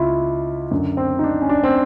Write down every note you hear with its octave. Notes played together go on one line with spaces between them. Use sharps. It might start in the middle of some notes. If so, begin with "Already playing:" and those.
Already playing: C#2 E4 F4
F#2 D3
C4
D#4
D4
C#4
D4
C4